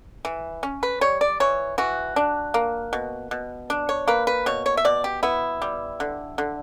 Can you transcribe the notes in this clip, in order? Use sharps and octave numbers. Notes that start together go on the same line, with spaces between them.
E3
C#4
B4
G3 C#5
D5
E3 C#5
E3 F#4
D4
A#3
B2
B2
D4
C#5
A#3 B4
B4
B2 C#5
C#5
E5
B2 D5
G4
B3 E4
G3
D3
D3